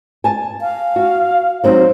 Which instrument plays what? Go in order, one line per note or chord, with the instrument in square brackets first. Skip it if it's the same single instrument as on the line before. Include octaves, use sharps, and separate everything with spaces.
[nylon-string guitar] G#5 A5
[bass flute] F5
[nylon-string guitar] F#4
F#3 C4 D#4